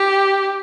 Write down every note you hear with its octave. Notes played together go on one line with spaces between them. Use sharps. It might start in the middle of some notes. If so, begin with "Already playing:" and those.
Already playing: G4